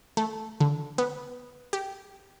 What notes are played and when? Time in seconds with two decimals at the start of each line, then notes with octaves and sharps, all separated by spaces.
0.17 A3
0.60 D3
0.98 B3
1.73 G4